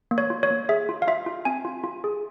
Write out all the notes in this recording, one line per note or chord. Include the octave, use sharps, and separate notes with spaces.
A#3
C#5
F4
C#5
A#3
G#4 E5
F4
F5
F4 E5
F4
C4 G#5
F4
F4
G#4